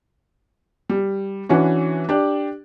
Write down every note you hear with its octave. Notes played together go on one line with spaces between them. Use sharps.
G3
E3 C#4 D4 F#4
D4 G4 D5